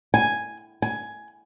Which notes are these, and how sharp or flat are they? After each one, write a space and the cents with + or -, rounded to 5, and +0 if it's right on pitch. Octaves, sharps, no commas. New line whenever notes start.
G#5 +0
G#5 +10